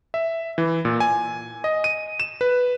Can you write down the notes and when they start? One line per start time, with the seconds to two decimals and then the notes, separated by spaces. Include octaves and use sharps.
0.14 E5
0.58 E3
0.85 A#2
1.00 G#5
1.64 D#5
1.84 D#7
2.20 E7
2.41 B4